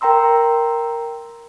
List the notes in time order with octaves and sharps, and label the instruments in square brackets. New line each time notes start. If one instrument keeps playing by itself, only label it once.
[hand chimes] A#4 G5 A#5 C6 E6